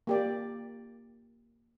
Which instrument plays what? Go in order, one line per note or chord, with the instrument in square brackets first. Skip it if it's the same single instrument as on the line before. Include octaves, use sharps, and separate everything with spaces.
[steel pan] A#3 G4 D5